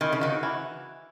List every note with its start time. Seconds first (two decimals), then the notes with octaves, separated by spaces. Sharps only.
0.01 D#3 E3
0.12 C#3
0.21 D#3 F#4
0.43 E3